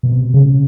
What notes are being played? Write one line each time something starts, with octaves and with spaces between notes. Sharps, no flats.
B2
C3
C#3